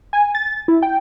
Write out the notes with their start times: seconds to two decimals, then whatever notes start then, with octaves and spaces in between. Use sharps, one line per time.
0.13 G#5
0.35 A6
0.68 E4
0.82 G5